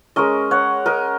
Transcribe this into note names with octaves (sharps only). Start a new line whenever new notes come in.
G#3 C#4 A#4 D#5
C#5 F#5
A#4 D#5